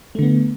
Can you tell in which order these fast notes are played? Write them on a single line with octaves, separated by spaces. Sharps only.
A3 D3 B3